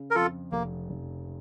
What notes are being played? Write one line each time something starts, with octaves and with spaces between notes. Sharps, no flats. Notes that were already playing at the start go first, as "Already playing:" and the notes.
Already playing: C#3
A#4
F2 F4 A4
F1 A#3
F1